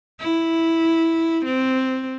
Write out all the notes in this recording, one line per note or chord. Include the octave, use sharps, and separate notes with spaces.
E4
C4